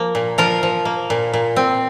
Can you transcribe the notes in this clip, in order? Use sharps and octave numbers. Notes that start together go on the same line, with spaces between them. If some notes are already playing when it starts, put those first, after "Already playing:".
Already playing: F3 A#3
A#2
F3 F4 A#4
F3
A#3
A#2
A#2
C4